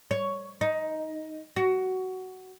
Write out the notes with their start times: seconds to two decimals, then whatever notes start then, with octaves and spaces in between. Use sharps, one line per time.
0.11 C#5
0.61 D#4
1.56 F#4